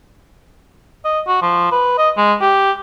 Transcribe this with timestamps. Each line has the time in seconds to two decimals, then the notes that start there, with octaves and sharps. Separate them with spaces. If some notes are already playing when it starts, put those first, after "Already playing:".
1.05 D#5
1.27 F#4
1.42 F3
1.72 B4
1.98 D#5
2.17 G#3
2.41 G4